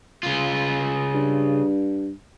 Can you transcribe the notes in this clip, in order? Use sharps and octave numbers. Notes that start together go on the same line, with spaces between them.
C#3 F4
G2